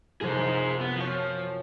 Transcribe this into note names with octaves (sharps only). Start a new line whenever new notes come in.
F#1 C3 F3 G#4 C5
B3
F3 F#4 C#5